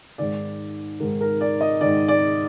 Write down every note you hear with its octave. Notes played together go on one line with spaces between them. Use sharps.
G#2 D#3 D5
G#2 D#3 A#4
A#4
D5
D#5
G#2 D#3 D5
D5